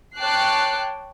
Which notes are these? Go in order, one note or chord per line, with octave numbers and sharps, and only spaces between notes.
C#5 G5 A5 D6 F#6 C7